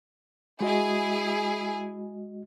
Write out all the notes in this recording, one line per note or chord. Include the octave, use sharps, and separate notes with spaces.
G#3 E4 F#4 G#4 D#5 G#5